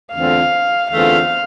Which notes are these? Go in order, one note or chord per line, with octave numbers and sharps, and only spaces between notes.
E2 D3 A3 C4 F4 F5
E2 D3 A3 C4 F4 F5